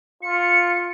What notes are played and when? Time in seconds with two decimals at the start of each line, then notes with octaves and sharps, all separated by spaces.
0.23 F4 C#7